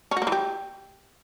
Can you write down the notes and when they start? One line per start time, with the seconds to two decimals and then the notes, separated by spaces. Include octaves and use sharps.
0.11 C#4
0.17 F#4
0.22 A#3
0.27 E3
0.32 G4